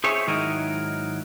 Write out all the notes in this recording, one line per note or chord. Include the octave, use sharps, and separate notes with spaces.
G#4 C5 C#5 E5 G#5
G#2 D#3 F#3 E4 A#4 D#5